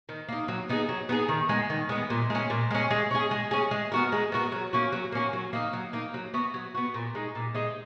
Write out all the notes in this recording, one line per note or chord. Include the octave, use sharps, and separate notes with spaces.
D#3
A#3 D#4
F#3
B3 D#4 G#4
F#3
B3 D#4 G#4
D#3
G#3 B3
D#3
G#3 B3
A#2
G#3 C#4
A#2
G#3 C#4
G#3
C#4 G#4
G#3
C#4 G#4
G#3
B3 F#4 A#4
G#3
B3 F#4 A#4
F#3
A#3 C#4 F#4
F#3
A#3 C#4 F#4
F#3
A#3 D#4
F#3
A#3 D#4
F#3
B3 F#4
F#3
B3 F#4
A#2
G#3 D#4
A#2
G#3 D#4